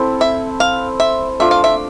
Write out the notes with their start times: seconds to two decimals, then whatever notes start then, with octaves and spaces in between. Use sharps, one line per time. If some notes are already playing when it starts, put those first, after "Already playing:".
Already playing: C4 E4 A4
0.21 E5
0.60 F5
1.00 E5
1.40 A3 D4 F4 E5
1.51 F5
1.64 E5